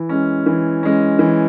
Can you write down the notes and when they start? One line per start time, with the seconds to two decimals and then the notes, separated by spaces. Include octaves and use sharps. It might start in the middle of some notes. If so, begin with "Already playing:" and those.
Already playing: E3
0.09 G#3 C#4
0.46 E3
0.83 G#3 C#4
1.19 E3